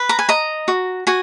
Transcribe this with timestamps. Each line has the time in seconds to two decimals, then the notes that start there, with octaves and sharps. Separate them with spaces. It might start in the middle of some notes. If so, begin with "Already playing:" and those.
Already playing: B4
0.09 A#5
0.19 G#5
0.29 D#5 A#5
0.68 F#4
1.07 F#4 G#5